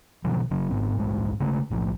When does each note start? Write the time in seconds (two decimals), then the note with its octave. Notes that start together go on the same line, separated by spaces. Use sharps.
0.24 B2 D#3 F3 F#3
0.50 F#1 C#3 F#3
0.71 G#1 G#2 B3
0.96 D1 A#1 G#2 G#3
1.40 C#3 G#3 A3
1.70 F#1 B1 A2 F3